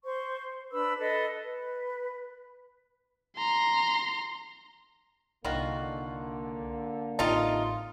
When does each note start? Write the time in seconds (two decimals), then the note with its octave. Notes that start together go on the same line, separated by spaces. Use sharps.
0.04 C5 C#6
0.72 D4 B4 B5 E6
0.99 A4 B4 D#5
1.44 B4
3.37 A#5 C6
5.44 C2 D3 D#3 A#3 F4 F#4
7.19 A1 C3 D#4 F4 F5 A5